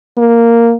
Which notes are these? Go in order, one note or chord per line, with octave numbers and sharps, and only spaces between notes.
A#3